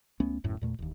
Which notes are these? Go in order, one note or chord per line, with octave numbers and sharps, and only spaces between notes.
C#2 A3 B3 C#4
D1 F#2 A2
E2 A#2 A3
E1 D#2